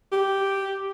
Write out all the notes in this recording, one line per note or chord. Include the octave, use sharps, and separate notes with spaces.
G4